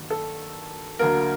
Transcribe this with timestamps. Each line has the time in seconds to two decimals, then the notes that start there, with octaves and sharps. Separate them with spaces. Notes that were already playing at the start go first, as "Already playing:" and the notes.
Already playing: G2 D#3 F#3 A#3
0.10 A4
0.99 D2 D3 F#3 A#3 A#4